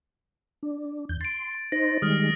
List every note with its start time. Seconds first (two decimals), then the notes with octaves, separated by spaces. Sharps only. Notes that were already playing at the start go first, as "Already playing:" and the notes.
0.63 D4
1.09 E2 G6
1.21 C6 A6 D7
1.72 D#4 C5 A#6
2.02 D#3 G3 G#3 D#6 F6